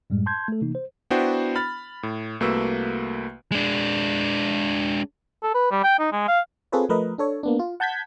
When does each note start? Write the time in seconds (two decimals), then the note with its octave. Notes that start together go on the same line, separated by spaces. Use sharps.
0.10 F#2 A2 G3 G#3
0.26 A5 C6 G6 G#6
0.48 A3 A4
0.61 C3 E3 A#3 D#4
0.75 C5
1.10 B3 D4 E4 F#4 C5 G5
1.56 B5 F6 A6
2.03 A2
2.40 C2 A3 A#3 F#4 B4 E6
3.52 G#3 D4
5.43 A4
5.55 B4
5.71 G3
5.84 G5
5.99 D#4
6.12 G#3
6.28 F5
6.72 C4 F4 G#4 A4 B4 C#5
6.89 F3 A3 A#4 B4 D#5
7.18 D4 A4 C#5
7.43 A#3 B3 D4
7.59 F4
7.80 F#5 A5 G6 G#6 B6